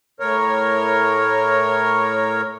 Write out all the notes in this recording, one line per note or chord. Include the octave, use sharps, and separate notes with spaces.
A2 A#4 C#5